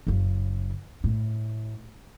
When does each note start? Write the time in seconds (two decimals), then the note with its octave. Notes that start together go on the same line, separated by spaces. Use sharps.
0.07 F#1 C#3
1.04 A2